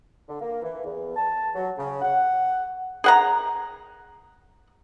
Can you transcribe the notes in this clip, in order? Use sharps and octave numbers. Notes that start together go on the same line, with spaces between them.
D3
A#3
E3
E2
A5
F#3
C#3
F#5
G#4 F#5 A#5